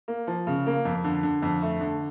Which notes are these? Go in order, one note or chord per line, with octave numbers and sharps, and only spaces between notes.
A#3
F3
C#3
A#3
F2
D3
D3
F2
A3
D3